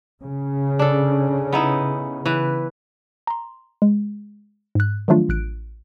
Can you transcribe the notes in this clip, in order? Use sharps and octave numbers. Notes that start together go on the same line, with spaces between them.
C#3
D4 A4
B3 D#4 E4
E3 B4
A#5 C6
G#3
G#2 F#6
D#3 F3 F#3 A3 D4 F4
A1 F#6 D7